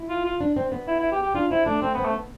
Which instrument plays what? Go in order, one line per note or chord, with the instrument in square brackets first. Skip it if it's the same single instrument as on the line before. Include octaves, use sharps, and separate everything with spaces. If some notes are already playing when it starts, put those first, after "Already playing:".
Already playing: [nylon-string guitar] E4
[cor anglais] F4
F4
[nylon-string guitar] D4
C4
B3
[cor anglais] E4
E4
G4
G4
[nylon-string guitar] D4 [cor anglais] F4
[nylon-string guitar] C4 [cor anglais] E4
[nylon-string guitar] A3 [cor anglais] D4
[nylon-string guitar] A3 [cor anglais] C4
[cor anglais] B3
[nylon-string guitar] C4
[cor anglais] A3
[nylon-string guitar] B3